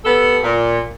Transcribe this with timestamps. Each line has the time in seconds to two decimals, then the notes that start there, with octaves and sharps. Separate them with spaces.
0.03 B3 G4 A4
0.43 A#2